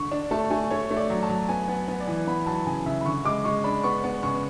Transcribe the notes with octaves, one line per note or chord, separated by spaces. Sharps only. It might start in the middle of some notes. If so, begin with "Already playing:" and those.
Already playing: D3 C#6
D4
A3 A5
A3 G#5
A3 C#5
A3
D5
F#3
A5
F#3
B3 G#5
B3
B3
D5
E3
B3 B5
F#3 A5
C#3 G#5
C#3 E5
B5
D3 C#6
G#3 D6
G#3 C#6
D4 B5
B3 C#6
B3
C#3 C#6